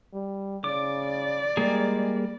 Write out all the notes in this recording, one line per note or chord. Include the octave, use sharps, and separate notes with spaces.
G3
C#3 D5 D6
G3 G#3 A#3 G#4